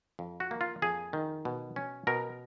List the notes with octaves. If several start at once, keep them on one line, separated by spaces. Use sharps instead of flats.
F2
F#4
A#3
F4
F2 G#4
D#3
B2
C#4
B2 A#4